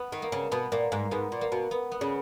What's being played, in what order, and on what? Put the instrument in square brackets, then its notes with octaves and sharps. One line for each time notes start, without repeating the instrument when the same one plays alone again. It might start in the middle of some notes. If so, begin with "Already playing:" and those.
Already playing: [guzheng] B3
[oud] D#3
[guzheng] A#3
[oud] C#3
[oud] B2 [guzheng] B3
[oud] A#2 [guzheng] A#3
[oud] G#2 [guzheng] A#3
[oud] G#2 [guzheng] B3
[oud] A#2
[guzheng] A#3
[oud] B2
[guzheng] B3
B3
[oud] C#3